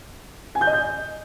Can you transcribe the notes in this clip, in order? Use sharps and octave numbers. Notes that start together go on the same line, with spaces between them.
G#5
G6
D#5
G6